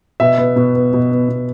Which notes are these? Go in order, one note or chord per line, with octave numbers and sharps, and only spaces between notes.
B2 E5
B3
B2
B3
B2
B3
B2